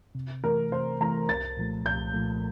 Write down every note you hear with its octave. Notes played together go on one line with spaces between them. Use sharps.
C3
E3 A3 A#4
C3 C5
E3 A3 A#5
C2 A6
A#2 F3 A3
C2 G6
A#2 F3 A3